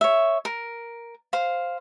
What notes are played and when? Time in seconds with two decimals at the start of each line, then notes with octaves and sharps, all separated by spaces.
0.01 C#5 E5
0.45 A#4
1.33 C5 F5